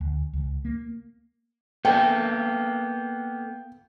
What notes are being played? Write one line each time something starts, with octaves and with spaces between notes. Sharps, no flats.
D2
C#2
A#3
A#3 B3 A4 G5